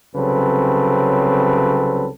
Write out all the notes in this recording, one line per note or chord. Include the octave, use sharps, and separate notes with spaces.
C2 C#3 F#3 C4 A4 B4